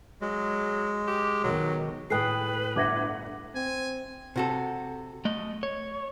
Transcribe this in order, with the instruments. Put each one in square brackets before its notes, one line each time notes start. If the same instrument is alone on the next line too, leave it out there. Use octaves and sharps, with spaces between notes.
[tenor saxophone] F#3 [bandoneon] G#3
[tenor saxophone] G4
[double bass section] B1 B2 D#3 [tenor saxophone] F#3
[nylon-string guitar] A2 G#4 [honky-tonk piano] A4 G5 [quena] B4 [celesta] D#6 F#6 C7
[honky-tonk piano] G1 E5 F#5 [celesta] D6 G#6 A#6
[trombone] C4 [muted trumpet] G#5
[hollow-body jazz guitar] C3 F#4 A4
[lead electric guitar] A3 D#5
C#5